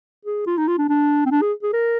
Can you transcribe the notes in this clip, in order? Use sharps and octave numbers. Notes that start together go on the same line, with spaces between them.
G#4
F4
D#4
F4
D4
D4
C4
D4
G#4
G#4
A#4